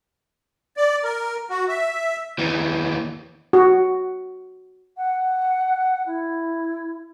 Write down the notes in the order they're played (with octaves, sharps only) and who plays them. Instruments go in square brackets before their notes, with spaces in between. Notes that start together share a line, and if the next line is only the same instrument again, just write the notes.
[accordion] D5
A#4
F#4
E5
[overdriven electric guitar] D#2 E3
[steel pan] F#4
[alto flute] F#5
E4